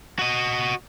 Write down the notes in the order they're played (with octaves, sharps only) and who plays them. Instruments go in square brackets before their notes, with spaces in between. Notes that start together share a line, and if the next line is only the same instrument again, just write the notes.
[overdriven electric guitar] F#4 D#5